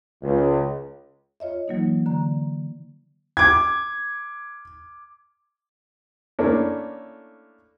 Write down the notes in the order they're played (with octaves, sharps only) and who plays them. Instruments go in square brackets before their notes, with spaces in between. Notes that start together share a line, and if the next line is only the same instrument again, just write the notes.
[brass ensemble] C#2
[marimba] F4 C#5 D#5 E5
E3 F#3 A#3 D#4
D3 A#5
[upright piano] D6 G#6
[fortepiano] A3 A#3 C#4 D4 E4